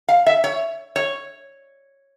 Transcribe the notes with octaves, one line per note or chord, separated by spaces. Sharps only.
F5
E5
C#5
C#5